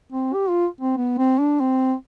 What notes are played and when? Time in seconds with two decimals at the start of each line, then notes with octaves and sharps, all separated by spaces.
0.12 C4
0.34 G4
0.49 F4
0.81 C4
0.97 B3
1.18 C4
1.39 D4
1.60 C4